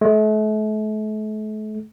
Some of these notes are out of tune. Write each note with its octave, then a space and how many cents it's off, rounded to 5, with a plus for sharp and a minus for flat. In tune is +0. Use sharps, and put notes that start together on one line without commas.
A3 -40